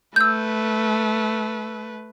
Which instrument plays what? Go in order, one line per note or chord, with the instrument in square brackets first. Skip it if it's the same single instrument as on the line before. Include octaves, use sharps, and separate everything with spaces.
[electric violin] A3 B4 [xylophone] E6 G6